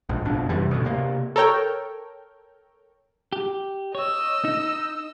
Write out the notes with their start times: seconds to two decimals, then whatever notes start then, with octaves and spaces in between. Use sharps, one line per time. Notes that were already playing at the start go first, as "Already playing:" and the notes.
0.09 A#1 G#2
0.25 F#1 F2 B2 D4
0.49 F#2 C3 E3 G3
0.71 D2 B2
0.85 C3 A#3
1.36 A4 A#4 C#5 G5
3.33 G4
3.95 C#5 D#5 E6
4.45 D#4